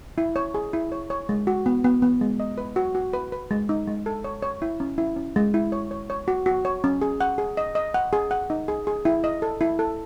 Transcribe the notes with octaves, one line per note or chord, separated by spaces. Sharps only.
E4
C#5
G#4
E4
C#5
C#5
G#3
F#4
B3
B3
B3
G#3
D#5
B4
F#4
F#4
B4
B4
G#3
D#4
G#3
A4
C#5
C#5
E4
C#4
E4
C#4
G#3
E4
C#5
C#5
C#5
F#4
F#4
C#5
C#4
G#4
F#5
G#4
D#5
D#5
F#5
G#4
F#5
D#4
G#4
G#4
E4
D#5
A4
E4
A4